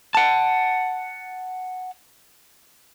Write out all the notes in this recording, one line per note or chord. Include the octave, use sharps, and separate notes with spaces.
F#5 A5